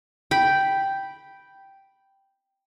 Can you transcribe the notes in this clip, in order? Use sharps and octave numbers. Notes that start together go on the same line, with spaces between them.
G5 B5